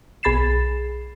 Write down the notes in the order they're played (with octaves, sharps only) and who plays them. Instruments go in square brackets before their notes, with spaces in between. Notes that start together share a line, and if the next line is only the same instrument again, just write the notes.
[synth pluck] B1 G#4 B5 A6 C7 E7